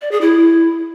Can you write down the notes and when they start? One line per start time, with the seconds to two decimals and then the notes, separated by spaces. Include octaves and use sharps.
0.02 D5
0.11 G#4
0.21 E4